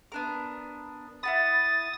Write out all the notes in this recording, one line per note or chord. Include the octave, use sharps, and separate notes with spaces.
B3 D4 A#4
E4 F#5 B5 D#6 A6